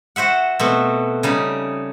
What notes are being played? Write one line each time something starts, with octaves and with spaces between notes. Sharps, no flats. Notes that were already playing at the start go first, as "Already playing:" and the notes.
F#4 C5 E5 F#5
B2 A3 C4
C#3 G3 D#4